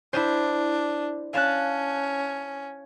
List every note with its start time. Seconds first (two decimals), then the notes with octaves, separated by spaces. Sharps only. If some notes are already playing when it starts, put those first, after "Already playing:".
0.13 D4 E4 C5
1.33 C#4 F5 A5 F#6